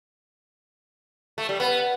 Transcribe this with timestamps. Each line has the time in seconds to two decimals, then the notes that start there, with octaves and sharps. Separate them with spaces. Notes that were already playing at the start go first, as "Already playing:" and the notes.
1.38 A3
1.49 G3
1.60 B3